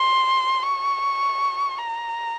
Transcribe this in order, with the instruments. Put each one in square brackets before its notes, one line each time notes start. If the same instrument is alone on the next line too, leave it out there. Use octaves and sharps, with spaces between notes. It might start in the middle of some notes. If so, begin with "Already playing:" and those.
Already playing: [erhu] C6
C#6
A#5